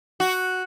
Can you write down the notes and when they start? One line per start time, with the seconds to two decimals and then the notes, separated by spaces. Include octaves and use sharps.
0.20 F#4